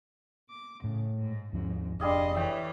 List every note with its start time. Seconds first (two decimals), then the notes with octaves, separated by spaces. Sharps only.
0.50 D6
0.84 A2 C#3
1.16 G#2
1.53 D#2 G#2 F3 C#4
2.00 F1 G3 D4 G#4 D#5 F5 C6
2.34 E3 A3 C#5 E5 G5